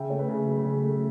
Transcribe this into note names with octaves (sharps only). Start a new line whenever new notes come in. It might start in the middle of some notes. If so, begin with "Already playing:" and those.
Already playing: C#3 E5 G5
A3 C#5
B4
C#3
F#3
C#3
A3